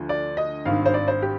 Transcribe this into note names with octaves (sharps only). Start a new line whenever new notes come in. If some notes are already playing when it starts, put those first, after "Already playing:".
Already playing: D2 D3 F3
D5
D#5
G#1 G2 D#3 F5
C5
D5
C5
G4